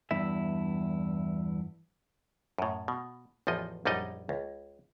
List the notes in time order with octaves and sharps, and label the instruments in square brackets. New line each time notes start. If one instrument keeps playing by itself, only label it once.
[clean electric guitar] E2 G2 E4 E5
[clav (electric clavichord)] F#2 A2
B2
A1 E2 F3 D#5
A#1 F#2 G3 D#4 D#5
C#2